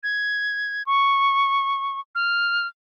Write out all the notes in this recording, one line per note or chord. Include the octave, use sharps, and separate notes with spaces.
G#6
C#6
F6